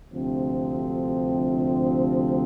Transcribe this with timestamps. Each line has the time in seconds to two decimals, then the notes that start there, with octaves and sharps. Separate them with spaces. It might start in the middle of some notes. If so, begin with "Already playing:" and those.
0.12 D2 C3 F3 C4